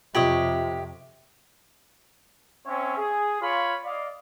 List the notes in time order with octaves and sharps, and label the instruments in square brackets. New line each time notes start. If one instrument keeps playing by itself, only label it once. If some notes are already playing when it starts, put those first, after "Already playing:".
[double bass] F2 C3 [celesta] F4 F#7 [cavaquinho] G4 C#5 D#5 [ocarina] E5
[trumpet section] C4 C#4 C#5 E5
G#4
F4 C#5 F5 B5
D5 D#5 F5